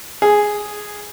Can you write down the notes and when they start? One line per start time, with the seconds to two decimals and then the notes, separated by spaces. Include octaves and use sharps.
0.22 G#4